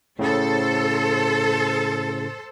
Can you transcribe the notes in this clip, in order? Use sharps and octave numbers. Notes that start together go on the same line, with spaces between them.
A2 C#3 A4 C5